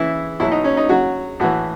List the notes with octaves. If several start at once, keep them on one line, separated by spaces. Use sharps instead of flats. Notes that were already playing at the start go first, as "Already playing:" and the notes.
Already playing: C#3 E3 E4
B2 F#3 E4
D#4
C#4
D#4
C#3 F#3 F#4
A2 E3 F#4